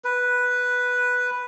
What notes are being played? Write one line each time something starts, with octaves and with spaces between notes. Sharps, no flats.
B4